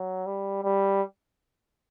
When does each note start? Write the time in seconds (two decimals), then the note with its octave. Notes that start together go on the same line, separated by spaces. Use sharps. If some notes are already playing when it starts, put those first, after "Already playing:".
Already playing: F#3
0.26 G3
0.63 G3